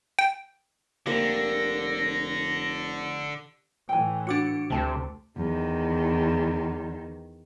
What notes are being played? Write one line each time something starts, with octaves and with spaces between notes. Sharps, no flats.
G5
F1 D3 G3 A#3 C5 A#6
A2 E3 G5 G#5
D4 F#4 F#5 D6 C#7
D2 C3 G4 A5
E2 D#3